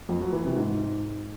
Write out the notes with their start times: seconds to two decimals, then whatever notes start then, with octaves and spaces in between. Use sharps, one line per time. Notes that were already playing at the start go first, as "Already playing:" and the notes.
0.09 F2
0.21 F#3
0.33 E3
0.44 C3
0.56 G#2